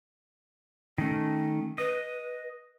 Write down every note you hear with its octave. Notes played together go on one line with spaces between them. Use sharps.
D#3 A3 C#4
B4 D#5